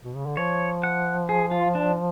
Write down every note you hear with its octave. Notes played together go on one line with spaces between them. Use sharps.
B2
C#3
D3
F3 C#5
F#5
G#4
F4
D4